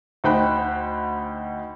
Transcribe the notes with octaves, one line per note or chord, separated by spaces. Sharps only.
D2 D#4 C5 G5 B5 F#6